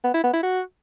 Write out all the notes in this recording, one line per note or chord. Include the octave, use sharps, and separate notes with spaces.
B3
E4
B3
E4
F#4